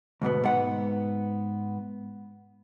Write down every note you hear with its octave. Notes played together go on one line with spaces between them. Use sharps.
D2 G#2 B2 B3
G#2 B3 F#5